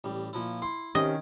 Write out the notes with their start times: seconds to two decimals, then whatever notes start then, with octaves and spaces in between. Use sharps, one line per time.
0.04 A1 G3
0.33 A#2 F3 E4
0.62 E4 C6
0.95 C3 D#3 C#4 D#5